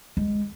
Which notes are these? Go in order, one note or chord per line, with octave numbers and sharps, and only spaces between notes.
G#3